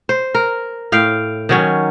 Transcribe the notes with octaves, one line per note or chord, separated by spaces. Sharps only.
C5
A#4
A2 F5 G5
D#3 F#3 C#4